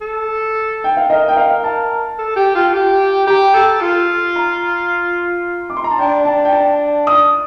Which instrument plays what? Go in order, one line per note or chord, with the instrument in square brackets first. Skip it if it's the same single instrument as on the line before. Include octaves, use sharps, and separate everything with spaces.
[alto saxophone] A4
[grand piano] G5
F5
[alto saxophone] A#4 [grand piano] D#5
[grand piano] G5
F5
A5
[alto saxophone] A4
G4
F4
G4
[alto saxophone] G4 [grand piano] A#5
[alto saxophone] A4
F4
[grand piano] A#5
D6
C6
A#5
A5
[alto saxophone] D4 [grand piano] G5
[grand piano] A5
G5
A5
D#6